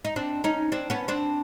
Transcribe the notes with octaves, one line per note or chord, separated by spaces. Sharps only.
D#4
C4 D4
C#4 D#4
C4 D4
B3 C#4
C4 D4